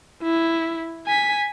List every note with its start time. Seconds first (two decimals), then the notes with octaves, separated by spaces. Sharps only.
0.23 E4
1.07 G#5 B6